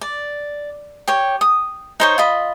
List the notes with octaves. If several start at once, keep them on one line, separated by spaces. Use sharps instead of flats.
D5
G4 C#5
D#6
D#4 C5 C#5
F4 D#5 B5